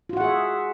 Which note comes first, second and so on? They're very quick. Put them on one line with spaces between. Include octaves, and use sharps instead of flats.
F4 F#4 F#5 G#4 E5